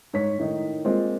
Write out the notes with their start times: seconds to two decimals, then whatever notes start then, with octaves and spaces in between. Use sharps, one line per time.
0.13 G#2 C#5 B6
0.38 A2 D#3 D#4
0.85 G#3 A#3 C4 F4